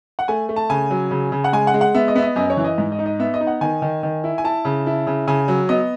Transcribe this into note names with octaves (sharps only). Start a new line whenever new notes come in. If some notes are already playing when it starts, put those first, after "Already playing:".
F#5
A3 G#5
A3
A5
C#3 G#5
F#3
C#3
C#3
F#5
G#3 G#5
F#5
G#3
F#5
B3 E5
D#5
B3 E5
D#5
F#2 D#5
C#5
E3
D#5
G#2
D#5
D#4
D#5
B3 E5
D#5
D#4
F#5
D#3 G#5
D#3
D#3
E4
G#5
E4 A5
C#3
E4
C#3
C#3 G#5
F#3
B3 D#5